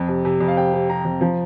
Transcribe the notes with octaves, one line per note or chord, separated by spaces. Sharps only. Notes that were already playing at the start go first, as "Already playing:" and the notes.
Already playing: F2
C3
C3
F2
F5
C3 G5
C3
C3 A#5
F2
F3